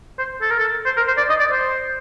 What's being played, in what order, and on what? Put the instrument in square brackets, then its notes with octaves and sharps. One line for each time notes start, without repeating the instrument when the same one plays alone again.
[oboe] C5
A4
A#4
A4
C5
A#4
C5
D5
D#5
D5
C5